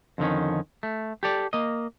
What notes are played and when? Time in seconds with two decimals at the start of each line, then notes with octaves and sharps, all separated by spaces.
0.18 F2 D3 D#3 C#4
0.83 A3
1.23 G4 A4 D5
1.53 A#3 D#5